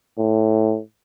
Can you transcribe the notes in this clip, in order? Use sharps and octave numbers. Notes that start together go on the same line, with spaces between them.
A2